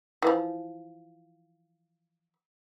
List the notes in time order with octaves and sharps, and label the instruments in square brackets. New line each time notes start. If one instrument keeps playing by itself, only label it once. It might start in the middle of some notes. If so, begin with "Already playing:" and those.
[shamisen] E3 F3